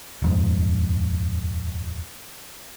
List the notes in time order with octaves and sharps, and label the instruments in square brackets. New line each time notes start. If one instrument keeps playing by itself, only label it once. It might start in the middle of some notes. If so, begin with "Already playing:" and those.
[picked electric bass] D#1 F2 G#2